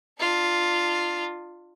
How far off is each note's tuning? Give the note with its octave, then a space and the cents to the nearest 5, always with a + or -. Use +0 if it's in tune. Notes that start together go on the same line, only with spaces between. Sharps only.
D4 +30 F4 +0